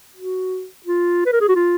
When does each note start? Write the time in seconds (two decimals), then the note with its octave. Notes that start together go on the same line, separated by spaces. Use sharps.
0.17 F#4
0.86 F4
1.26 B4
1.33 A#4
1.41 G#4
1.49 F#4
1.56 F4